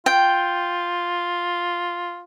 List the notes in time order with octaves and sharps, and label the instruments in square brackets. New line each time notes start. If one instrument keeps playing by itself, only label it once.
[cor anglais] F4 [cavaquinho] G5